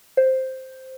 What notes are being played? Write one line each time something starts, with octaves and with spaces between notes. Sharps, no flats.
C5